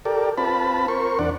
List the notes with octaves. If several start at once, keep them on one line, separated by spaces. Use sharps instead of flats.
G4 A4 A#4 D5
C4 F4 B4 A5 B5
A#4 C5 C#6
E2 D4 D5 F#5